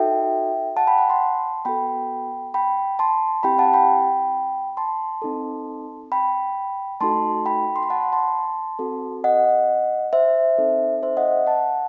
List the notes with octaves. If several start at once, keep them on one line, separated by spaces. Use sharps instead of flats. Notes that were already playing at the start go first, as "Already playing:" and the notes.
Already playing: D#4 F#4 A4 E5 G5
F#5 A5
G5 B5
F#5 A5
A5 C6
B3 F#4 A4 G5 B5
G5 B5
A5 C6
C4 E4 G4 G5 B5
F#5 A5
G5 B5
A5 C6
C4 D#4 A4
G5 B5
A3 D#4 F#4 A4 A5 C6
G5 B5
C6
B5
F#5 A5
A5 C6
C4 F#4 A4
D#5 F#5
C5 E5
C4 D#4 A4
C5 E5
D#5 F#5
F#5 A5